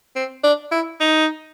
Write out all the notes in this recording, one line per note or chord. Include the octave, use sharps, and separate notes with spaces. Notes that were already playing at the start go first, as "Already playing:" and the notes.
C4
D4
E4
D#4